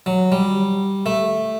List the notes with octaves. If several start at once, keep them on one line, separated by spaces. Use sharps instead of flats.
F#3
G3
A3